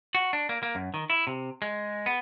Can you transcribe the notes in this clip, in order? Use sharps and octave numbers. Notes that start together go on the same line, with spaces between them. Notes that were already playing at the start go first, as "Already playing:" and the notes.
F#4
D4
A#3
A#3
F#2
D#3
E4
C3
G#3
B3